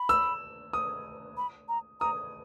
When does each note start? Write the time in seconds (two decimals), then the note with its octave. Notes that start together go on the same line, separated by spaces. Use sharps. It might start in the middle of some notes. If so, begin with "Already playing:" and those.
Already playing: B5
0.09 E6
0.73 D#6
1.37 B5
1.68 A#5
2.00 A#5 D#6